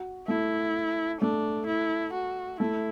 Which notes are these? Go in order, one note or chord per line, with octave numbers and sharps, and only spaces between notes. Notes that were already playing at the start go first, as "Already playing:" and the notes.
Already playing: F#4
A3 E4
A3 D4
E4
F#4
A3 E4